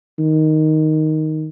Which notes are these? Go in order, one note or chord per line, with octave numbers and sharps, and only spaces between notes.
D#3